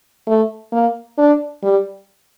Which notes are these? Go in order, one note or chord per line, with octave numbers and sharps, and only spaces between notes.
A3
A#3
D4
G3